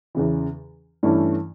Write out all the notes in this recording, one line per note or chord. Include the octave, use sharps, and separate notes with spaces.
E2 C#3 E3
G2 E3 A3 C#4 E4